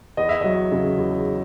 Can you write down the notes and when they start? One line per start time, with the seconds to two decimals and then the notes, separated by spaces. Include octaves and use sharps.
0.17 E2 D#5
0.29 E5
0.41 F#3 D#5
0.72 C#3
0.98 E2